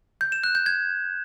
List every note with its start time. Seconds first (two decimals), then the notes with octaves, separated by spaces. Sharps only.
0.21 G6
0.32 E7
0.44 F#6
0.55 G6
0.66 G#6